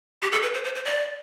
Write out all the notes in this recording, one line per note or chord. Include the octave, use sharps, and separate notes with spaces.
G4
A4
B4
C5
C5
C5
D5